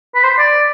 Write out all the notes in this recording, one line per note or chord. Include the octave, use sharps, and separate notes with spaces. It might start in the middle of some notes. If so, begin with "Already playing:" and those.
B4
C5
D5